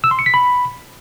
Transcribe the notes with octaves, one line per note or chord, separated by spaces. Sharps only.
E6
C6
C#7
B6
B5